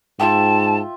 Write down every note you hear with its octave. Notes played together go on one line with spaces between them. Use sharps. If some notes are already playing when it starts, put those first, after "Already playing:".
G#2 F4 E5 G5 A5